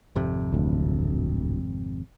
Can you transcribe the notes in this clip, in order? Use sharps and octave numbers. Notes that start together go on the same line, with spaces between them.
G#1 F2 C3
D1 D2